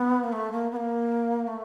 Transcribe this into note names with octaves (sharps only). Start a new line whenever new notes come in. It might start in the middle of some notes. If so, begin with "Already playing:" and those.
Already playing: B3
A#3
A3
A#3
B3
A#3
A3